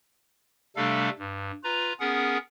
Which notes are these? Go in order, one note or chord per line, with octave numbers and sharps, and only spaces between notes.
C3 G3 A3 D4 A4 F5
G2
F4 B4 A#5
B3 C#4 G#4 A#4 F#5